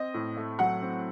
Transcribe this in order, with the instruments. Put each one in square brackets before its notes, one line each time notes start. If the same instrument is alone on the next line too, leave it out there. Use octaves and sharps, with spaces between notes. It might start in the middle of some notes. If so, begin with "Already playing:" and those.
Already playing: [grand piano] C4 [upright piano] D#5
[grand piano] A2
A3
[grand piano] F#3 [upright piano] F#5
[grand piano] C4